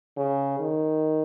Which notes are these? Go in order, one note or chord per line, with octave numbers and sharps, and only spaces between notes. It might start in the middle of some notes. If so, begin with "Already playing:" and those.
C#3
D#3